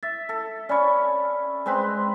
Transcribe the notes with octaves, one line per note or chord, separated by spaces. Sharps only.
E5 A6
A4
C#4 C#5 D5 B5
G#3 C4 B4